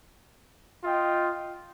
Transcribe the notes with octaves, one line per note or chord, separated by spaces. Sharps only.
F4 D#5 G5